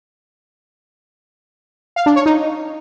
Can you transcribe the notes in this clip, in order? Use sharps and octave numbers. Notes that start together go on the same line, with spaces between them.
F5
D4
C#5
D#4